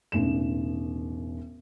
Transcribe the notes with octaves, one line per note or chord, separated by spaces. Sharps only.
E1 A1 D#3 E7